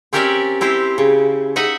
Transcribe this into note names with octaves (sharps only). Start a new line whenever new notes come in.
C4 C#4 G4 A#4 D5 E5
C4 E4 G4 C5
C#3
D#4 D#5 E5 F#5